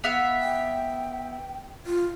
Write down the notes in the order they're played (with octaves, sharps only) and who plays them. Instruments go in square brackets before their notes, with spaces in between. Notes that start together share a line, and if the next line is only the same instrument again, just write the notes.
[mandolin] B3 E5 F5
[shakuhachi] G5
F4